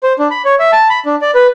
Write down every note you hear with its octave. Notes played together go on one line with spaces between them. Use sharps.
C5
D4
B5
C#5
E5
A5
B5
D4
D5
B4